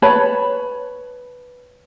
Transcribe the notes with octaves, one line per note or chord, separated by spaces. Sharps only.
B4 C#5 A5 B5